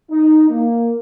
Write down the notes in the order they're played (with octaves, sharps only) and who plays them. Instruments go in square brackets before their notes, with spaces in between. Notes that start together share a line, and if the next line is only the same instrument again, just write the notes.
[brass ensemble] D#4
A#3